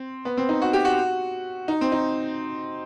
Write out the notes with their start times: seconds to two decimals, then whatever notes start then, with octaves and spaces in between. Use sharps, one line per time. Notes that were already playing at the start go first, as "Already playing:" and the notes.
Already playing: C4
0.25 B3
0.37 C4
0.49 D#4
0.62 F#4
0.73 G4
0.85 F#4
1.68 D#4
1.81 C4
1.92 D#4